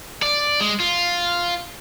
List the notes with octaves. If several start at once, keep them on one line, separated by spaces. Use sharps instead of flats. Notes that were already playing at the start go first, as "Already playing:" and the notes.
D5
G#3
F4